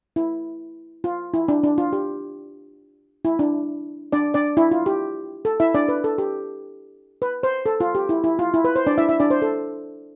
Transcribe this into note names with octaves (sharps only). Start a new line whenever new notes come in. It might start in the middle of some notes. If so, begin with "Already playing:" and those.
E4
F4
E4
D4
D4
F4
G4
E4
D4
D4 D5
D4 D5
E4
F4
G4
A4
E4 E5
D4 D5
B4
A4
G4
B4
C5
A4
F4
G4
E4
E4
F4
E4
B4
C5
D4 D5
E4 E5
E4 E5
D4 D5
C5
A4